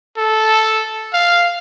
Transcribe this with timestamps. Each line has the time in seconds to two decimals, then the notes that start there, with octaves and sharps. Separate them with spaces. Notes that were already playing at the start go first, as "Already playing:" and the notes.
0.17 A4
1.13 F5